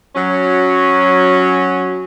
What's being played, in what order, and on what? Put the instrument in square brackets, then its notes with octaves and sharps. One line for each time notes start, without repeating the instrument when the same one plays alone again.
[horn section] F#3 C#4